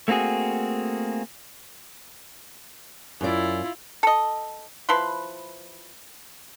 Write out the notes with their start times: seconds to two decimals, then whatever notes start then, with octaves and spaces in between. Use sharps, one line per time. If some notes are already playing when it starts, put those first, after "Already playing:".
0.08 A3 A#3 C4 F#4 G#4
3.21 F#2 E4 F4 D5
4.03 A4 D#5
4.89 F3 E4 B4 C6